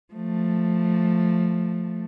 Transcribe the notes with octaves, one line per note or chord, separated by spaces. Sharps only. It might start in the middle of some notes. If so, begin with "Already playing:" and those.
F3 A3